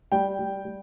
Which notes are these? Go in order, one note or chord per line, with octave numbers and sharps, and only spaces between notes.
G3 G5
G3
G3